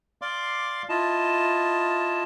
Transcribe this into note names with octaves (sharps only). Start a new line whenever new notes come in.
D5 F5 C6 D6
E4 F4 D#5 A5